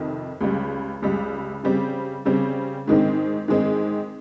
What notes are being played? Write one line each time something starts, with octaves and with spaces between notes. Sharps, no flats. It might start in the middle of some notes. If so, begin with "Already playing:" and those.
Already playing: F2 C3 D#3
C#2 C#3 G3
C#2 C#3 G3
C#3 G3 C4
C#3 G3 C4
G#2 D#3 G#3 C4
G#2 D#3 G#3 C4